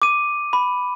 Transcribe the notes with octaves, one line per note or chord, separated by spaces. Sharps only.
D6 D#7
B5